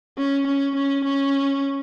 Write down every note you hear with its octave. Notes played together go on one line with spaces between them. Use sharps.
C#4
C#4
C#4
C#4